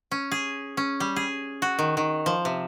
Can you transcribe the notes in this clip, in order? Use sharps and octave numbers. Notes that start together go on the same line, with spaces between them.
C#4
G#4
C#4
G3
G#4
F#4
D#3
D#3
F3
C3